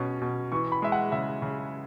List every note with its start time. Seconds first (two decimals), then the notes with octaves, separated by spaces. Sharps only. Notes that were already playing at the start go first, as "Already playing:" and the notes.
Already playing: B2 C#4
0.22 B2
0.52 E3 C#6
0.72 B5
0.82 G#3 E5
0.92 F#5
1.12 C#3 E5
1.42 C#3